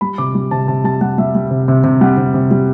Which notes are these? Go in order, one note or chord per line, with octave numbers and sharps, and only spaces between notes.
G3 B5
C3 D6
G3
C3 A5
C3 A5
G3 A5
G3 F#5
G3 E5
G3
C3
C3
C3
G3 F#5
C3
C3
G3